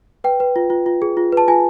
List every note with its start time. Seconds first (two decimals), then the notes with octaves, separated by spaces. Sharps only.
0.24 B4 G5
0.40 B4
0.56 F4
0.70 F4
0.86 F4
1.02 G#4
1.17 F4
1.32 B4 A5
1.48 F4 G#5